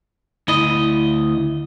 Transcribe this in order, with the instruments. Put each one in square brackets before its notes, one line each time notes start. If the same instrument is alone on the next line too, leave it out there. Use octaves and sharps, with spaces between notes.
[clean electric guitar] D2 D#5 [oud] E4